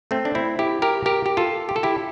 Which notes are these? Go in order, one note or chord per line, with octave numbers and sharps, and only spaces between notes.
A3 C4
D4
C4 E4
E4 G4
G4 A#4
G4 A#4
G4
F4 A4
G4
A4
E4 G4